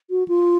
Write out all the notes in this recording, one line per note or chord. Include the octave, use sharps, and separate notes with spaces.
F#4
F4